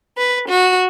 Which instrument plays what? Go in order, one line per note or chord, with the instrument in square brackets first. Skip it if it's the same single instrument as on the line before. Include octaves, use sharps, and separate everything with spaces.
[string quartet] B4
F#4